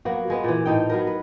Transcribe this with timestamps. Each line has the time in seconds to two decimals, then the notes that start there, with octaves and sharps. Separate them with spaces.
0.05 F#3 A#3 B3 F#4
0.28 F#3 G#3 B3
0.44 A#2 E3
0.65 A2 D#4 G5
0.90 F#3 B3 A#4
1.07 B4